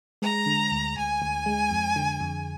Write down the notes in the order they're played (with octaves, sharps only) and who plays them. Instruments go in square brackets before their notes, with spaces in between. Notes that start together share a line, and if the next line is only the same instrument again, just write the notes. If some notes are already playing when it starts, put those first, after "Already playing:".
[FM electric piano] G#3 [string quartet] A#5
[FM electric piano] D3
D2
[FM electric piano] D2 [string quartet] G#5
[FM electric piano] D2
G#3
F2
D3
F2